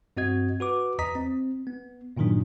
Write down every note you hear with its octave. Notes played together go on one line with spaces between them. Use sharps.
G2 C4 F#4 D#5 G#6
F#4 B4 D6
E2 B4 D#5 A#5 D#6 B6
C4
B3
G2 A#2 D3 D#3 F#3 D4